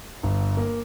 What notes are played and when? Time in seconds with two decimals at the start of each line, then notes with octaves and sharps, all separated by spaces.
0.23 G1
0.57 A#3